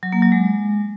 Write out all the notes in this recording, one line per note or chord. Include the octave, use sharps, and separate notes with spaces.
F#3
A#3
F#3
G#3